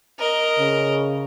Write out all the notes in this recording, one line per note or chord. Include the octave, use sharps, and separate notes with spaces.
A#4 D#5
C#3